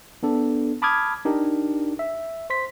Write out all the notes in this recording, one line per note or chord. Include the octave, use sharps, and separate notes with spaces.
B3 D4 A4
A5 B5 D6 D#6 F6 G#6
D4 D#4 G4 A#4
E5
C5 C6 B6